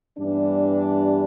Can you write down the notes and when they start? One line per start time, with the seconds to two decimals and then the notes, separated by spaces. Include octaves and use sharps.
0.18 G2 E3 G3 B3 D4